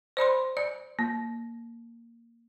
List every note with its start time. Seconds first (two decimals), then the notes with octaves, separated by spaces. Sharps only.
0.17 C5 D5 B5 C6
0.57 D5
0.99 A#3